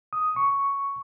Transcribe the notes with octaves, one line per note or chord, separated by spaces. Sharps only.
D#6
C#6